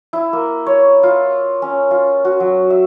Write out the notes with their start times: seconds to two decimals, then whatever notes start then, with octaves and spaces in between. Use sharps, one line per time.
0.13 E4
0.33 A#3
0.67 C#5
1.03 F4
1.62 C#4
1.91 F4
2.25 F#4
2.40 F#3
2.70 E5